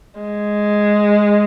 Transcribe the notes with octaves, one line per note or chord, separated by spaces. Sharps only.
G#3